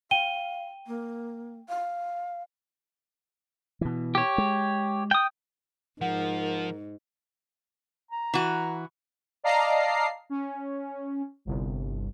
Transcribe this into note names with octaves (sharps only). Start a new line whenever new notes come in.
F5 G5 D#7 G7
A#3
F5
B2 E3
G4 C#5
G#3
G5 D#6
G#2 F3 A#4 F#5
A#5
E3 F#4
D5 D#5 F5 A5 A#5 C7
C#4
G1 C2